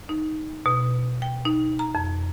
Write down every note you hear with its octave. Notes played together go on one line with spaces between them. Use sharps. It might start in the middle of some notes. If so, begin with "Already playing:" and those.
D#4
B2
G5
D#4
A#5
F2